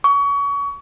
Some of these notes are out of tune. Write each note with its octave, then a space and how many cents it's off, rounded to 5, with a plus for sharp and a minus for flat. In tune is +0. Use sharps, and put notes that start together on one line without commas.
C#6 +30